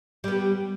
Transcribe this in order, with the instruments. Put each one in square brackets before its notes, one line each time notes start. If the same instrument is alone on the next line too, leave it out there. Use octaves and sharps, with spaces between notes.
[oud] G3
B3
G4